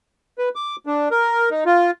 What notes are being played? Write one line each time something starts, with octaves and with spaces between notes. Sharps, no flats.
B4
D6
D4
A#4
D#4
F4